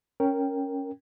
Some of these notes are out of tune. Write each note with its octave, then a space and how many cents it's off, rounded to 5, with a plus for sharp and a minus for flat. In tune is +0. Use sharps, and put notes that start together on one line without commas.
C#4 +0 A#4 +0 G5 +0